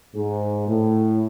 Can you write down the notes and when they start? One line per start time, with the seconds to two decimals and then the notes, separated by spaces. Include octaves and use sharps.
0.15 G#2
0.68 A2